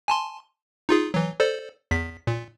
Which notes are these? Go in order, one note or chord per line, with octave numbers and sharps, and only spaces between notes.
G#5 A5 C6
D#4 F4 G#4
E3 F#3
A4 C5 D5
E2 B6
A#2